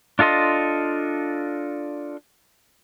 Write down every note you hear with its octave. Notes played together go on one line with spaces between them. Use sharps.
D4 F4 A4 D#5 C6